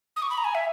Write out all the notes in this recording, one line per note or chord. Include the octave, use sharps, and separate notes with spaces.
D#6
C#6
B5
A#5
G#5
E5